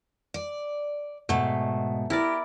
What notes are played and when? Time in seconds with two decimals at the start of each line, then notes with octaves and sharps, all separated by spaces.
0.34 D5
1.29 G#2 B2 A3
2.10 E4 G4 A#4 D5